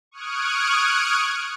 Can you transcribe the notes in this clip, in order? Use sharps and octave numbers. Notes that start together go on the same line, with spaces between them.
C#6 D#6 F6 F#6 G#6 D7